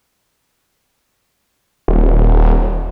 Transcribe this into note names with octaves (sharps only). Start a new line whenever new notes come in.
D#1